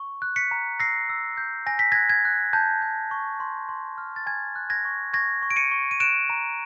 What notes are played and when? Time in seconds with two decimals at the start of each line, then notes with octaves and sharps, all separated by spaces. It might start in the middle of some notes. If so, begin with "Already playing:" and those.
Already playing: C#6
0.22 F#6
0.36 B6 C#7
0.51 A#5
0.80 E6 A#6 C7
1.10 E6
1.37 G6
1.66 G#5 A#6
1.79 B6
1.92 G#6 A#6
1.95 F#6
2.10 G#6
2.25 F#6
2.53 A5 G6
2.82 G6
3.11 C#6
3.40 C6
3.69 C6
3.98 F6
4.16 A6
4.26 G#5 G#6
4.56 F#6
4.70 G#6 A#6
4.85 C#6
5.13 C#6 G#6 A#6
5.42 C#6
5.51 D7
5.56 C#7 D#7
5.71 C#6
5.91 D#7
6.00 F#6 D7 E7
6.30 A#5